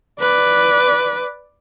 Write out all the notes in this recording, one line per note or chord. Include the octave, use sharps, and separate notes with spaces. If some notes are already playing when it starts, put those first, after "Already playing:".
B4 D5